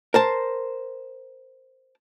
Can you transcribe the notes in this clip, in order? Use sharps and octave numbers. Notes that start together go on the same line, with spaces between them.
A#4 C5 A5